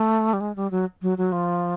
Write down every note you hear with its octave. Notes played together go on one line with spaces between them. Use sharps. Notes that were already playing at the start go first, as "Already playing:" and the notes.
Already playing: A3
G3
G#3
G3
F#3
F#3
F#3
F3